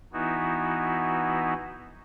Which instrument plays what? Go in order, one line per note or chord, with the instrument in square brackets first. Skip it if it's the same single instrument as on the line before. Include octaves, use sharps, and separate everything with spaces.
[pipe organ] E3 B3 D#4 E4 F#4